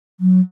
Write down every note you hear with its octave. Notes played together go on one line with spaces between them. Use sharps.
F#3